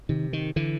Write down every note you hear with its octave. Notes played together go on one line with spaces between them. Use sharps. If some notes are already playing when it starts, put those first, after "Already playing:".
C3 D#3
D#3
D3 E3